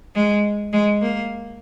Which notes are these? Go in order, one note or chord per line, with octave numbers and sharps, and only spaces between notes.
G#3
G#3
A#3